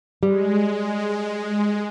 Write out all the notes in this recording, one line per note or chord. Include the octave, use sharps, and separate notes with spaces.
G3 G#3